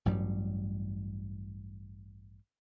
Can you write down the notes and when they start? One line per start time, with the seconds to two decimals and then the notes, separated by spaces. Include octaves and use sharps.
0.06 A1 G2 F#3 G3